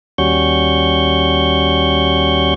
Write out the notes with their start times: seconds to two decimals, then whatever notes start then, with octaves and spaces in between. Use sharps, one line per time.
0.18 D#2 G3 C#4 F#4 C#6 G6